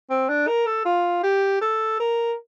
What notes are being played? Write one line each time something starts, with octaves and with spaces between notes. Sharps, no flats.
C4
D4
A#4
A4
F4
G4
A4
A#4